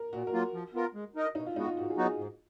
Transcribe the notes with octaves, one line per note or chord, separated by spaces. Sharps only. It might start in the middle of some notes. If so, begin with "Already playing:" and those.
Already playing: A#4
A#2 F#4
A#4
F#3 A#3 F4
F3
B3 F4 A#4
G#3
D#4 A#4 D#5
B2 D#4
F4
G#3 B3 D#4 F#4
F4
G#2 F#4
G#4
F#3 B3 D#4 F#4
G#4
G#2